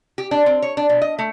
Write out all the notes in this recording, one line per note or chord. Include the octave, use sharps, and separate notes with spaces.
G4
D4
C4
C#5
D4
B2
D#5
A3